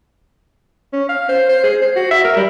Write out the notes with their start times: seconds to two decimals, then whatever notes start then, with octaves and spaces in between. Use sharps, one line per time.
0.93 C#4
1.09 F5
1.29 C5
1.49 C5
1.64 G#4
1.82 C5
1.96 F#4
2.11 E5
2.24 A#4
2.37 G3